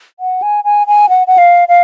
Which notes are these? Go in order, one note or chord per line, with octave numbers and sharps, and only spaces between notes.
F#5
G#5
G#5
G#5
F#5
F#5
F5
F5